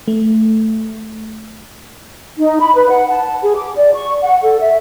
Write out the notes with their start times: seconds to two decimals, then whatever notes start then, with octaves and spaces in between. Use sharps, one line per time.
0.08 A3
2.39 D#4
2.59 B5
2.75 B4
2.89 F#5
3.10 A5
3.42 G#4
3.57 D6
3.77 D5
3.94 C#6
4.21 F#5
4.43 A4
4.60 E5